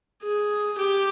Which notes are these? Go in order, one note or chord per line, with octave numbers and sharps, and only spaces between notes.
G#4
G4